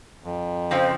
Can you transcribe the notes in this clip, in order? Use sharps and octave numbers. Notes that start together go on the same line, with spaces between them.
F2
C#3 F3 C4 C5